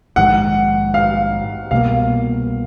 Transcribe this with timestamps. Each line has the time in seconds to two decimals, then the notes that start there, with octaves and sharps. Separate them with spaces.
0.16 A#1 G#2 D#3 F#5
0.94 F5
1.71 C2 B2 G3 A#3 F5